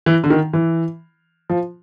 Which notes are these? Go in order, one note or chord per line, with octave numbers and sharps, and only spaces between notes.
E3
D3
D#3
E3
F3